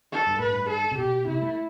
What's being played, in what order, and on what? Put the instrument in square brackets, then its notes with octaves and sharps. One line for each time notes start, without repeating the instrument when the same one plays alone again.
[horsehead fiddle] A4
[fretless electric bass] G2
[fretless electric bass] A2 [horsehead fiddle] B4
[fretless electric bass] G2
[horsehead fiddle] A4
[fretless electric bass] C3
[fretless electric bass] B2 [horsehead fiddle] G4
[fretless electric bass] C3 [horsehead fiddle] E4
[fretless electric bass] A3